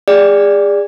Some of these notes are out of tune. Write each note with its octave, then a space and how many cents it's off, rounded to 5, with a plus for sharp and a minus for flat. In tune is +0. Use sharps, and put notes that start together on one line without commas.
G#4 -35 D5 +0